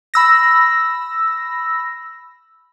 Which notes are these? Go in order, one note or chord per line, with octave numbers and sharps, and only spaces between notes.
B5 E6 A#6